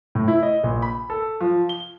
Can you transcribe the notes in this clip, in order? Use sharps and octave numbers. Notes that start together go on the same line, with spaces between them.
A2
E4
D#5
A#1
B5
A4
F3
G7